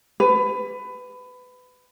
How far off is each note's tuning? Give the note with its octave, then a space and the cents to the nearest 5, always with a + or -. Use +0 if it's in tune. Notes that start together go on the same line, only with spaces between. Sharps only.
B4 +20